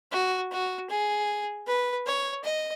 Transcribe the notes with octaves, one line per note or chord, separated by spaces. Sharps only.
F#4
F#4
G#4
B4
C#5
D#5